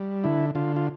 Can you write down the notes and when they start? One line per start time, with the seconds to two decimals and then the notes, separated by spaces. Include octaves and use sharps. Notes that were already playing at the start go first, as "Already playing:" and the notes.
Already playing: G3
0.24 D3 E4
0.55 D3 F4
0.76 F4